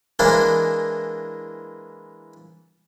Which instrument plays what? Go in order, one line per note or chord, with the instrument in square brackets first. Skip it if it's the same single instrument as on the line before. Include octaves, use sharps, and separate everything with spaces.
[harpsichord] E3 G#3 A#3 D4 E4